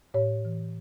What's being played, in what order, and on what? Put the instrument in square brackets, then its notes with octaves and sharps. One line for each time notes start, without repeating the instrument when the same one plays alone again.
[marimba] A2 C#5
E3